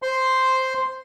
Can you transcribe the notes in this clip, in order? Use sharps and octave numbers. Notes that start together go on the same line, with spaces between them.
C5 C6